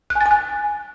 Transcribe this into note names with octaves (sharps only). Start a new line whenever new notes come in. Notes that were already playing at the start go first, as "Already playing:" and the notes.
F#6
G#5
A6
G#5
F#6